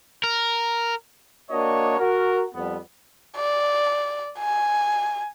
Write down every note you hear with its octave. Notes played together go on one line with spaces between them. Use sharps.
A#4
A#3 D4 F#4 C#5 D#5
F#4 A#4
F2 G3 B3
D5
G#5